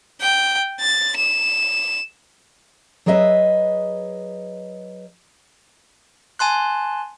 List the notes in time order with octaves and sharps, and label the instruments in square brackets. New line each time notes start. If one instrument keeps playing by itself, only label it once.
[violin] G5
A6
E7
[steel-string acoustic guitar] F#3 G#4 B4 D#5 E5
[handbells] G#5 A5 C6 F#6